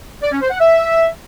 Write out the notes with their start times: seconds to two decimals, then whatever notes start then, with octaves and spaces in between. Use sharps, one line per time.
0.23 D5
0.32 C#4
0.41 C5
0.50 F#5
0.60 E5